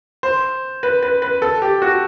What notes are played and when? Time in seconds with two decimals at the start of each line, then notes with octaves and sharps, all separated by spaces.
0.23 C5
0.83 B4
1.03 B4
1.22 B4
1.42 A4
1.62 G4
1.82 F#4